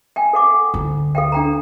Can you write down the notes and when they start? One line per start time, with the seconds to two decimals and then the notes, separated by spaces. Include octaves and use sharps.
0.16 G5 G#5
0.33 A4 F#5 D6
0.74 D2
1.15 A4 F5 G5
1.32 D4 G5 A#5